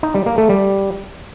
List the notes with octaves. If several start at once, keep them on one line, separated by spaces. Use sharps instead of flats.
D#4
G3
A#3
A3
G3